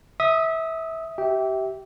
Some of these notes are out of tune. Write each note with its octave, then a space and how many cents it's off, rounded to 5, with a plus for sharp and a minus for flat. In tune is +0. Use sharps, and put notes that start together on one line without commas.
E5 -20 D#6 +0
G4 -25 E5 -15 G5 -5